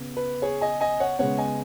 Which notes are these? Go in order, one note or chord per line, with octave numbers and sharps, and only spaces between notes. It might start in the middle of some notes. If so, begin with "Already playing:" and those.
Already playing: C#3 B3
B4
G#4 C#5
D#5 G#5
D#5 G#5
C#5 F#5
C#3 G#3 B3 C#5 F#5
D#5 G#5